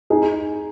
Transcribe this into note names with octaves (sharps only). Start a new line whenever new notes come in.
D#4 G#4